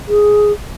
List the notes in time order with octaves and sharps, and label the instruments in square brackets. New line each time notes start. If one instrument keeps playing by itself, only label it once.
[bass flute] G#4